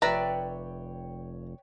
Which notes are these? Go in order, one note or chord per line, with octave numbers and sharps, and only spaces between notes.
F1 B4 C#5 D5 E5 G5 A#5